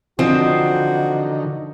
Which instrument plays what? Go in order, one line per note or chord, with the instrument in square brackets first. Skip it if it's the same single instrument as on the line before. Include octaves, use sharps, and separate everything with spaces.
[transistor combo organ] D3 D#4 [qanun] F3 D#5 [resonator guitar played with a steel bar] C4 [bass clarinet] F#4